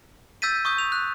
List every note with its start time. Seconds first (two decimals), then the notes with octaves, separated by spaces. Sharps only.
0.42 E6 G6 A6 B6 D#7
0.65 C#6 D#6 G6
0.78 F7
0.92 F#6